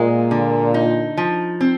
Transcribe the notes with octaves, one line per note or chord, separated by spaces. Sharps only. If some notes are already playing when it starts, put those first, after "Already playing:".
Already playing: A#2 G#3
D3
D#4
F3
C4